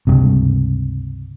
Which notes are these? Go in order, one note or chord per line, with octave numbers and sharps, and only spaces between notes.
C#2 G2 C3